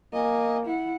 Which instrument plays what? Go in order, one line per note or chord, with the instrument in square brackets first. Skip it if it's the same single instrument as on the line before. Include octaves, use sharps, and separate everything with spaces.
[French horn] A#3 [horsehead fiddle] D#5 G#5
[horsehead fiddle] E4 F#5